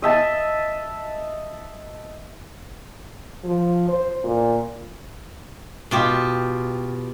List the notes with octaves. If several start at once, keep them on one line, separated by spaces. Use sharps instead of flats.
D#5 E5 A5
F3
C5
A#2
B2 F4 G4